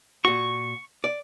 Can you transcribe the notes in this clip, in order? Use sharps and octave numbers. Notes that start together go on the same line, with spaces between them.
A#2 F#4 C#6
D5